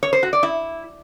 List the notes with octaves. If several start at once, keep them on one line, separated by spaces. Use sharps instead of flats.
C#5
C5
F#4
D5
E4